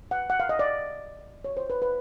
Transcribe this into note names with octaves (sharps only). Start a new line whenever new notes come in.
F#5
F#5
F5
D#5
D5
C#5
C5
B4
B4